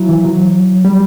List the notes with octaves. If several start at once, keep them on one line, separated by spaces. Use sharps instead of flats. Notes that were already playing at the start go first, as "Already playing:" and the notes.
Already playing: F#3 E4
E3
F#3
G3